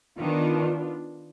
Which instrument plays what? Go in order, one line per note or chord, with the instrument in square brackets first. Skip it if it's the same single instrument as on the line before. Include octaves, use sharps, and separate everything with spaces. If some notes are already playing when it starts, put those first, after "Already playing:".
[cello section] D#3 [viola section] B3 D4 F4